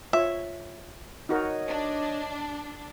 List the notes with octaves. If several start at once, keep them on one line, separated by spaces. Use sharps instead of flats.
F4 C#5 E5
D#4 F#4 A#4 C#5 D#5
D4